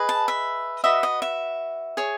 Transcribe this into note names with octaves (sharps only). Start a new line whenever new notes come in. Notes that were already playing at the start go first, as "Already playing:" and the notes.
Already playing: G#4 B4 D#5
A5
E5
F#4 B4 D#5 E5
D#5
E5
G#4 C#5